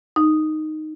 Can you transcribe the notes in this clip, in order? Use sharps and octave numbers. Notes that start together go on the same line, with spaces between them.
D#4